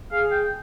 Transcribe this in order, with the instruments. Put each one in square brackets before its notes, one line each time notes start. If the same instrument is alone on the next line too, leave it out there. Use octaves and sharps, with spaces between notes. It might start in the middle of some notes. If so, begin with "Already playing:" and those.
[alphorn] G#4 [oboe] F5
[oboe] G5